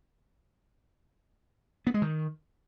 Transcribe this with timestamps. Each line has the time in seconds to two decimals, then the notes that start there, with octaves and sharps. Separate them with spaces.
1.87 B3
1.94 G#3
2.02 D#3